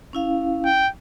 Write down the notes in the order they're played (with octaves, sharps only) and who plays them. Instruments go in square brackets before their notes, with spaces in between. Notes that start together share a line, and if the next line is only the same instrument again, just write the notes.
[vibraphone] C#4 E4 F5
[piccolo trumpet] G5